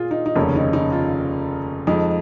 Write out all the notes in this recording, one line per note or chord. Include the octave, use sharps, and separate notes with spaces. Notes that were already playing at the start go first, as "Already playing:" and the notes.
Already playing: A#2 F4 G#4
D#4
D#4
F1 D#2 C#3 C#4
D#4
D#4
F4
F2 F3 G#3 D#4